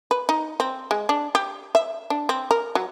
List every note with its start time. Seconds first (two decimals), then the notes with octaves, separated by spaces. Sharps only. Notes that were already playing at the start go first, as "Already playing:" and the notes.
0.11 B4
0.29 D#4
0.60 C4
0.91 G#3
1.09 D4
1.35 G4
1.75 E5
2.10 D4
2.29 C4
2.51 A#4
2.75 F#3